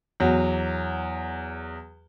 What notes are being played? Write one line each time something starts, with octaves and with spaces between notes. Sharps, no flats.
E2 F#3